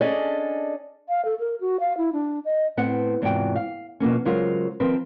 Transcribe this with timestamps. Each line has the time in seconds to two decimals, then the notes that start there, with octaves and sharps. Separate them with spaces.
0.01 C#4 D4 G#4 A4 D5 D#5
1.09 F5
1.25 A4
1.39 A#4
1.61 F#4
1.80 F5
1.97 E4
2.13 D4
2.45 D#5
2.77 A2 B3 C4 F#5
3.22 E2 G#2 C3 F4 F#4 G5
3.56 F5
4.00 B2 F3 A#3 C#4
4.25 C#3 F#3 G#3 F4 A#4 C5
4.80 D#3 F3 C4 F4 A#4 B4